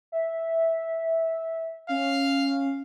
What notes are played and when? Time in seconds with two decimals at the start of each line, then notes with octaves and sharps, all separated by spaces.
0.12 E5
1.89 C#4 F5